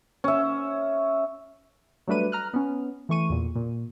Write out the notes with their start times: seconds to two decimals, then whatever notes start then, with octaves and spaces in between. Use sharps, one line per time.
0.24 C#4 E5
2.07 F#3 G3 A3 D4 B4 D#7
2.32 A#5 F6 F#6
2.54 B3 C#4
3.09 E3 A3 C#6 D#7
3.30 E2 A#2
3.55 A#2